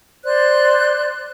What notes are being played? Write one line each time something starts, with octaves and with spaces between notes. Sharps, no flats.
C5 D5 C6 F#6